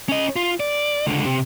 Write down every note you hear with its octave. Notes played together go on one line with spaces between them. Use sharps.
C#4 D#5
F4
D5
C#2 D3
C3